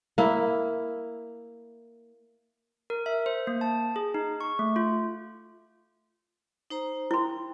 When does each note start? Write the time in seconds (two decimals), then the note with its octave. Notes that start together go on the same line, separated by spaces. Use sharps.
0.18 A#3 E4
2.90 A#4
3.06 E5
3.26 C5
3.47 A#3
3.61 A5
3.96 G#4
4.14 D#4
4.41 C#6
4.59 A3
4.76 F4
6.70 D#4 C5 A#5
7.11 E4 G5 C6